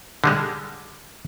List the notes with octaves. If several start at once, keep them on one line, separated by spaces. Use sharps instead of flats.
D3 G3 G#3